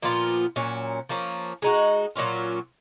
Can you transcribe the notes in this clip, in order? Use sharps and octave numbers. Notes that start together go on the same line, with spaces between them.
A#2 F3 B3 F4
A#2 F#3 C#4
F3 A#3 C#4
G#3 D#4 F#4
A#2 F#3 C#4 F4